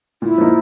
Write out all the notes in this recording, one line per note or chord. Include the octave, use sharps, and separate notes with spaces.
A#2 E4
F3 A#3 D#4